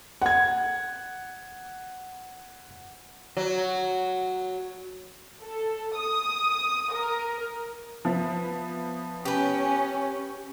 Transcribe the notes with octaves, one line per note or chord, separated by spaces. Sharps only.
F#5 G#6
F#3
A4
D#6
A#4
F3 B3 E5
C#4 G4 B4